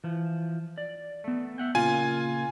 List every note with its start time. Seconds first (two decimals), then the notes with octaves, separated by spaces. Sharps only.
0.04 E3 F3
0.78 D5
1.24 A3 B3
1.58 E5 F#5 G5
1.75 A#2 C#3 A#3 F4 G#5